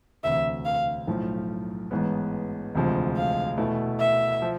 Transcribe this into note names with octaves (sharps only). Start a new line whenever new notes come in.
E1 D2 C3 E5
F5
B1 A2 F3
A1 G#2 G#3 B3
E1 D2 C3 F3 G#3
F5
E2 B2 A3 E4
E5
F3